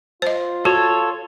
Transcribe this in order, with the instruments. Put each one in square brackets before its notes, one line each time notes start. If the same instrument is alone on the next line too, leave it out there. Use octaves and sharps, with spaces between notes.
[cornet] F4 [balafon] C5 D#5
[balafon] F#4 [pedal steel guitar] A4 C#5